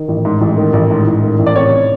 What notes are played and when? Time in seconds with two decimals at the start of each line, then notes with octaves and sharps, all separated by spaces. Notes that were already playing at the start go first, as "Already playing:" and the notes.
Already playing: D#3
0.08 A1
0.25 G#2
0.41 A1
0.57 D#3
0.73 A1
0.91 G#2
1.07 A1
1.23 D#3
1.39 A1
1.46 D5
1.56 C3 C#5